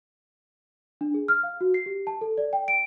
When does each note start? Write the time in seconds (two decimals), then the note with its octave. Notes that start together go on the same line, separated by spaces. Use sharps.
1.01 D4
1.14 G#4
1.28 F6
1.43 F5
1.61 F#4
1.74 C7
1.86 G4
2.07 A5
2.21 A4
2.38 D5
2.53 G5
2.68 D7